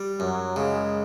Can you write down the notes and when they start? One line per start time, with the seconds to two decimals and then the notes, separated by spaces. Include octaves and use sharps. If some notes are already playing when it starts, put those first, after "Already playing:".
Already playing: G3
0.20 F#2 F#3
0.56 C#3 G#3